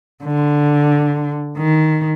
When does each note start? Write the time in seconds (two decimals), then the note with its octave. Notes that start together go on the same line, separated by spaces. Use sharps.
0.24 D3
1.57 D#3